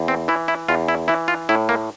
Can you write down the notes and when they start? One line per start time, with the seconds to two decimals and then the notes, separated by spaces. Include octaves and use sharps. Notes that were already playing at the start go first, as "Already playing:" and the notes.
Already playing: E2
0.08 C4
0.28 E3 E4
0.48 E4
0.69 E2 F4
0.88 E4
1.08 E3 E4
1.28 F4
1.49 A2 E4
1.69 A#3